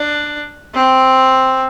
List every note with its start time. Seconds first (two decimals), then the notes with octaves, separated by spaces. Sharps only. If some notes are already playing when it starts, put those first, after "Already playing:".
Already playing: D4
0.75 C4